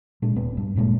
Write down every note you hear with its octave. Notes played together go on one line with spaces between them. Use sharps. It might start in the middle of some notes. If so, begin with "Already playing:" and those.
A#2 G#3 D4
D#1 B3
G2
F#1 A#2 G#3 A#3